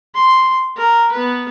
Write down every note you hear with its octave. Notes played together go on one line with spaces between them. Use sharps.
C6
A#4
B3 B4